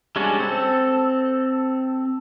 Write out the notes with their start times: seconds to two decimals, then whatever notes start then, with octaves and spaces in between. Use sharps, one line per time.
0.16 G3 G#3 C#4 D4 F#4
0.40 C4 A4